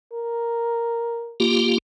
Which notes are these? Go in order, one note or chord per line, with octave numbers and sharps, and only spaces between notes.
A#4
A#3 F4 G4